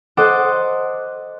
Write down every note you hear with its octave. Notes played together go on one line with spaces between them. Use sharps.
A4 C5 D#5 F#5 D6 E6